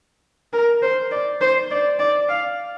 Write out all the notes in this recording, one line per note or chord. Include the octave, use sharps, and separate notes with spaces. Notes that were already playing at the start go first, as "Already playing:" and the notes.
A#4
C5
D5
C5
D5
D5
F5